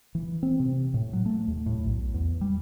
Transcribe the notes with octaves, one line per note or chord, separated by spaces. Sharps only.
E3
C4
C3
A2
F#3
A3
D#2
A2
B1
E2
G3